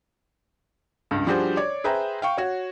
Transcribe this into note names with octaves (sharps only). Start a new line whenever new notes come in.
C#2 G2
F3 G3 D4 F#4 G#4 C5
C#5 D5 D6
G#4 B4 C5 E5 G5 A#5
F5 G5 C#6
F#4 C#5